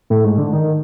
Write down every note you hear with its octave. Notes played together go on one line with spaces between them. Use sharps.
A2
G#2
D3
D#3